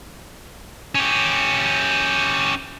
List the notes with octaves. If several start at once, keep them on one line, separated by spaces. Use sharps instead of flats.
C#4 G4